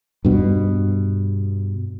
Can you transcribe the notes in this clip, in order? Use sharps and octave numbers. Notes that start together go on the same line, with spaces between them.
G2 B2